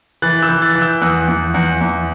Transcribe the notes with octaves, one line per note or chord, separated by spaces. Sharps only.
E3 F#6 A6
E6 G6
E3
F#6 A6
E3
E6 G6
E2 D#6 F#6
E2
E2
E2